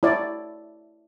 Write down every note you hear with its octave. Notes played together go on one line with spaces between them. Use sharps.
E4 C#5 D5